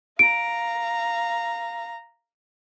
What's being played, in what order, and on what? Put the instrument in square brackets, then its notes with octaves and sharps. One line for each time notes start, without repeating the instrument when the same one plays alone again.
[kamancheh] F5 A#5 [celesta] D7